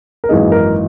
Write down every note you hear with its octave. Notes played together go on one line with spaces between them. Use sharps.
A#4
G#1 F#2 E3 A#3 D#4 G#4
A#4